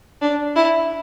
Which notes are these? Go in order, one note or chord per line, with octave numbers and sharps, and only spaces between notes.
D4
E4